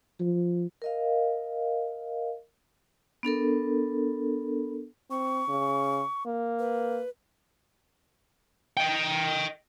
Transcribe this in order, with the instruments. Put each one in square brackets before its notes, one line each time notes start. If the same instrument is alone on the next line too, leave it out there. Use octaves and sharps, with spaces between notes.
[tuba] F3
[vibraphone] A#4 D#5 F5
B3 D4 A4 A#4
[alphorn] C4 [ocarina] C#6
[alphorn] C#3
A#3
[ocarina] B4
[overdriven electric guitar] D#5 G5